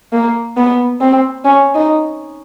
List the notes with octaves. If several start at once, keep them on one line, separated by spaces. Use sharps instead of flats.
A#3
B3
C4
C#4
D#4